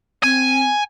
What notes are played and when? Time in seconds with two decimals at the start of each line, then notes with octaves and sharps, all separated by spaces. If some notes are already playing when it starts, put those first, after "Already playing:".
0.23 C4 G#5